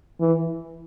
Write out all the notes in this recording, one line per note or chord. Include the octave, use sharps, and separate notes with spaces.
E3